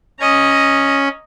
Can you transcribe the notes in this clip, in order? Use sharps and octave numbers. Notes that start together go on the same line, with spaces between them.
C#4 D#5 A#5